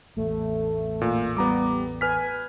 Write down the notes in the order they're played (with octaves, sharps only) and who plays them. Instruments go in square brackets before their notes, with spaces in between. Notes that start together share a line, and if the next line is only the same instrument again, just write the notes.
[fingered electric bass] A1 E2 [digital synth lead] A3
[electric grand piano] A#2
[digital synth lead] G3 [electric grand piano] B3 A#5 D6
[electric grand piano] B4 F6 B6 [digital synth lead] G#5